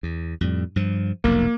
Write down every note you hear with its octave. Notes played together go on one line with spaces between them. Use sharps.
E2
F2 A2 G3
G2 F3
F1 B1 F2 A#3